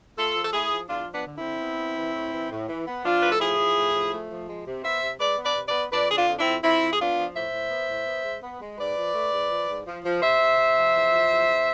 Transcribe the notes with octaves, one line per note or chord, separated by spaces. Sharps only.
A3 F4 A4
F3
A4
A3 E4 G#4
F3
E2 D4 F4
F3
B3 D4
D3
C4 E4
D3
B3
B3
E3
A2
E3
A2
E3
B3
F3 D4 F4
A2 B4
A4
F3 E4 G#4
F3
A2
F3
A3
F3
G#3
C3
B3 C5 E5
C3
G#3 B4 D5
B3
B4 D5
C3
B4 D5
B3
F2 B4 D5
D3 G#4
D4 F4
F2
D4
C4 E4
F2
F2 C4 E4
F2
G#4
B3 D4 F4
F3
A2 C5 E5
A2
B3
A2
B3
G#3
B3
G#3
G#2 B4 D5
F3
A3
G#2
F3
G#2
F3
F3
C3 C5 E5
C3
C3
F3
E2
F3
E2
E2